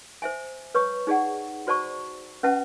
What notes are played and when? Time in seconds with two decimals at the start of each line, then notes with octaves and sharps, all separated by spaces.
0.22 C5 E5 G#5
0.75 B4 C#5 C#6 D#6
1.07 D#4 G#4 D5 F#5
1.67 F#4 C5 D5 A5 C#6
2.43 C#4 B4 E5 F#5 A5